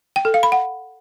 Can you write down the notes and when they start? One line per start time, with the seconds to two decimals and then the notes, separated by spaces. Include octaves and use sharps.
0.16 G5
0.25 A4
0.34 F5
0.43 B5
0.52 F#5